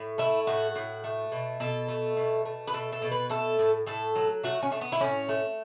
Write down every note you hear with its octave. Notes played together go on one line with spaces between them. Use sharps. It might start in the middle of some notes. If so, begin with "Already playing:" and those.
Already playing: A2
A3 E4
A2 F#4
A2
A3
B2
B2 A4
A3
B2
A3
B4
B2 A4
A4
B2
B4
A3 A4
A2
A2 A4
F#3
A3 F#4
C#4
A3
B3
E4
A2 C#4
A3